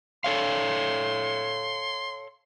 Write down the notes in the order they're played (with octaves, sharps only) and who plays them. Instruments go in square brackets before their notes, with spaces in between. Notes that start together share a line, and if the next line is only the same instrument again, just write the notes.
[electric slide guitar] A4 C#5 F5 [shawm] C6